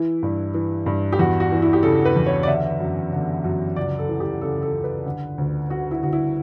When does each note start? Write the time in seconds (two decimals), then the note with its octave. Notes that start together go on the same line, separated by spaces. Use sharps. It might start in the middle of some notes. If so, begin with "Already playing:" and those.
Already playing: E3 E4
0.23 G2
0.54 E3
0.86 G2
1.12 G4
1.19 E2 F#4
1.40 F#4
1.52 E3
1.62 E4
1.73 G4
1.83 C#3 A4
2.05 B4
2.16 E2
2.26 C#5
2.43 D5
2.47 D3 E5
2.80 F#2
3.13 D3
3.44 F#2
3.76 C#2 D5
3.99 A4
4.08 E3
4.20 G4
4.41 C#3 A4
4.62 A4
4.73 C#2
4.84 B4
5.06 D3
5.38 D2
5.70 D3 F#4
5.91 E4
6.03 D2 F#4
6.13 E4